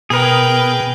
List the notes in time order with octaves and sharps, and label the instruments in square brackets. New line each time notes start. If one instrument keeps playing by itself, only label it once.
[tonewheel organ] B2 [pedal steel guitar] G#4 A#4 [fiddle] B4 G5